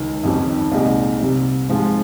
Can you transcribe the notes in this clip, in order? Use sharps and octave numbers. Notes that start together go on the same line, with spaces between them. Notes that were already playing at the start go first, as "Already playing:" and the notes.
Already playing: C#2 D#3
F2 D#3 G3 C#4 G4
C2 A#2 G#3 D#4 G4
C2 C3 G3
G#2 F3 G#3 C4